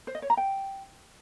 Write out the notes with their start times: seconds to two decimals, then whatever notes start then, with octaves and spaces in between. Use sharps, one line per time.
0.07 C5
0.15 D#5
0.22 C#5
0.30 A#5
0.37 G5